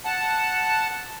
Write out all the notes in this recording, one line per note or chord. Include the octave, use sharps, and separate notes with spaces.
F#5 A5